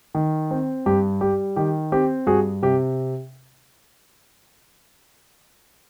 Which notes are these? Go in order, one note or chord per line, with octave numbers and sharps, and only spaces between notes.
D#3
C4
G2 G4
G3 G4
D#3 G4
C4 G4
G2 F#4 G#4
C3 G4